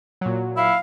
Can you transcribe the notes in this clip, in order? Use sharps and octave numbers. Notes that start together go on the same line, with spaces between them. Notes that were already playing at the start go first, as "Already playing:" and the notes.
A#2 F#3
E4 F5